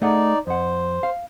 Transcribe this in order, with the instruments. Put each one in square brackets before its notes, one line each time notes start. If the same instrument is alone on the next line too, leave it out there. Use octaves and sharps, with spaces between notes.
[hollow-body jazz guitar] A3 G#4 F#5 [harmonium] D#4 D5
[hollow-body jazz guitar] F2 F#5 [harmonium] C5
[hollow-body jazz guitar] F5